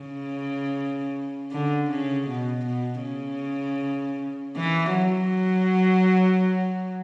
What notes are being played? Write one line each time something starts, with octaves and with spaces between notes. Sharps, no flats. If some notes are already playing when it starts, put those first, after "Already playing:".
Already playing: C#3
D3
C#3
B2
B2
C#3
E3
F#3